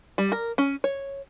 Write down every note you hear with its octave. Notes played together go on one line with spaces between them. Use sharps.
G3
A#4
C#4
C#5